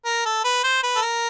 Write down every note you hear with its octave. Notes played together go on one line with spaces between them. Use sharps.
A#4
A4
B4
C5
B4
A4
A#4